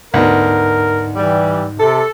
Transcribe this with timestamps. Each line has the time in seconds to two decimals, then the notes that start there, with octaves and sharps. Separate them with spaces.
0.14 D2 G#2 B3 D#4 A#4
1.16 E3 G3
1.80 C3 A4 A5